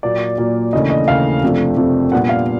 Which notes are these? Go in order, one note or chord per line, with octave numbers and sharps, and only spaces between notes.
A#2 F#3 A#3 D5
A#2 F#3 A#3
D#2 C#3 E3 A3 D4 D#5
D#5
D#2 C#3 E3 A3 D4 F5
F2 C3 F3 A3 D4
F2 C3 F3 A3 D4
A#2 G3 B3 D4 F#5
F5